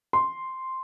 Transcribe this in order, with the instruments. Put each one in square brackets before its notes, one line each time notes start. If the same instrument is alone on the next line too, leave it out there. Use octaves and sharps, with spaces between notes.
[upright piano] C6